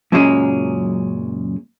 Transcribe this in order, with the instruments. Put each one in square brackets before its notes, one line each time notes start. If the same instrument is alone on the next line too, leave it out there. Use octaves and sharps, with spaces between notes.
[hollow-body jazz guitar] F#2 A#2 C#3 F#3 G#3 C#4